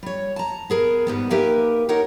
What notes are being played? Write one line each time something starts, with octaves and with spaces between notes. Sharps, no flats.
G3 C#5
A5 A#5
B3 G#4 A#4
G#2 G3 B3
A#3 D#4 G4 A#4 B4 E5
D#4 A#4 C#5 F#5